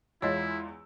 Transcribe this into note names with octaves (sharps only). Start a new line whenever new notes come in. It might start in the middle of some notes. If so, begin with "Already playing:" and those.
E2 G#3 E4 F4 C#5 D#5 E6